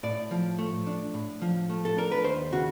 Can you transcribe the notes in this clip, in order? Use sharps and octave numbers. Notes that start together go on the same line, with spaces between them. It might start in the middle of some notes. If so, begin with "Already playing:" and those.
A2 D5
F3
A3
D4
A2
F3
A3
A4
D4 A#4
B4
D#2 C5
C#3 F#4